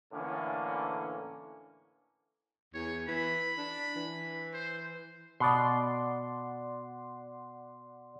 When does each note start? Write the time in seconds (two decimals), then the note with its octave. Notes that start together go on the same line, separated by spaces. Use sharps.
0.12 A2 D3 E3 A#3 C#4 D4
2.74 E2 C#5
3.08 E3 B5
3.58 D4
3.96 E3
4.54 C5
5.40 B2 D5 F#5 C6